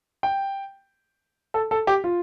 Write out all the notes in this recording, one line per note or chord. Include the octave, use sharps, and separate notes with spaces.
G5
A4
A4
G4
F4